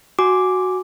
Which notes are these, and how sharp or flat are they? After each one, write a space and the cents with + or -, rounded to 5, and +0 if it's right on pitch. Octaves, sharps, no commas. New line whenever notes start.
F#4 +0 G#5 +0 D6 +0